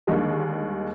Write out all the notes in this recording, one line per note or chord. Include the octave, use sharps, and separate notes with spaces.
D#2 D3 D#3 G3 G#3 A#3